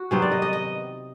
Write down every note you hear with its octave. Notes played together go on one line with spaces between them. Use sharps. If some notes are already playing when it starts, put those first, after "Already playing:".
Already playing: F#4
C3 D#3 F#3 B3 C5
D5
D#5
D#5
D#5